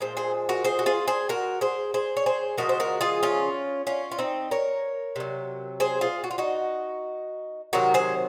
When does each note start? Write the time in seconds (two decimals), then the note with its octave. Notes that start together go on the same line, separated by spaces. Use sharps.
0.01 A#2 F3 G#3 C5
0.17 G#4 C5
0.49 F#4 A#4
0.64 G#4 C5
0.79 F#4
0.86 F4 G#4
1.08 G#4 C5
1.29 F#4 A#4
1.61 G#4 C5
1.94 G#4 C5
2.17 C#5
2.26 G#4 C5
2.58 C#3 F3 G#3 F#4 A#4
2.69 C5
2.80 F#4 A#4
3.01 F4 G#4
3.23 C#4 F4
3.87 C#4 F4
4.12 F4
4.19 C4 D#4
4.51 A#4 C#5
5.16 C3 F#3
5.80 G#4 C5
6.01 F4 G#4
6.24 F#4
6.31 F4
6.38 D#4 F#4
7.73 C3 D#3 F#3 F#4 A#4
7.94 G#4 C5